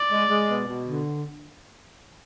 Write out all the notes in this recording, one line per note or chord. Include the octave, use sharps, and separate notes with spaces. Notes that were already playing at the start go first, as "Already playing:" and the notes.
Already playing: D5
G#3
G#3
B2
B2
D3